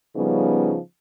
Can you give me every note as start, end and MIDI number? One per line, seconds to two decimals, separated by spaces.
0.16 0.78 49
0.16 0.78 53
0.16 0.78 55
0.16 0.78 59
0.16 0.78 61
0.16 0.78 63